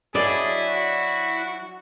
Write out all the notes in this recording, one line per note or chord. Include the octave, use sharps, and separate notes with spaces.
F#3 D4 E4 G#4 D5 D#5
F#4